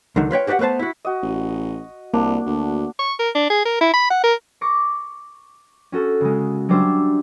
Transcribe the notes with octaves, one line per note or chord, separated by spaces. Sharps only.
C#2 D3 D#3 F#3
F4 B4 C#5 G5
F#4 G4 B4 D5 F#5
A3 B3 B4 C5 A5
E4 F#4
F#4 D#5
A1
C2 A#3 D4
D2
C#6
A#4
D4
G#4
A#4
E4
B5
F#5
A#4
C#6 D6 A#6 C#7
C#4 F#4 A4
C#3 G#3
F#3 G3 D4 C5 E5